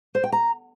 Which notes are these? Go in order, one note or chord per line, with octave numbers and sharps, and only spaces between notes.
C5
G5
A#5